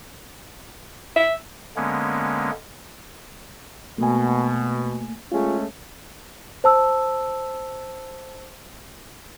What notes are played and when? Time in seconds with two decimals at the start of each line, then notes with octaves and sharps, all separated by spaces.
1.16 E5
1.76 D3 G#3 A#3 B3 C#4
3.98 B2 A3 A#3 G#5
5.32 G#3 A3 C#4 F4 G#4
6.64 C5 A5 E6